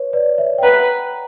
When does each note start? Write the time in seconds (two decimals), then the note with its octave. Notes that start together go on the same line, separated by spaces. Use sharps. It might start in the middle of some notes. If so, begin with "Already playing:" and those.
Already playing: B4 C#5
0.13 B4 D5
0.38 C#5 E5
0.58 G5
0.62 B4 F#5 A#5